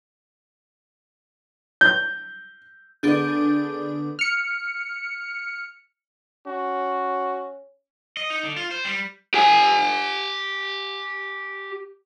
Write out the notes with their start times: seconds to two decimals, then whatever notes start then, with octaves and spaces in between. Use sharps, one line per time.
1.81 G6
3.03 D3 B3 D4 G#4 D5 G6
4.19 F6 C#7
6.47 C#4 F#4
8.17 D#5
8.30 D#4
8.43 D3
8.56 F4
8.71 C5
8.85 G3
9.34 G4 G#5